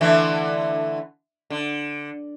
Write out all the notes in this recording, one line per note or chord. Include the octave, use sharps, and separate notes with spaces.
D3 E3 A3
D3